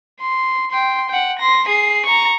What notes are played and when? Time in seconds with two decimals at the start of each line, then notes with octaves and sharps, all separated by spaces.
0.21 C6
0.71 G5 C6
1.09 F#5 G5
1.39 C6 A#6
1.68 G#4 C7
2.05 A#5 C#6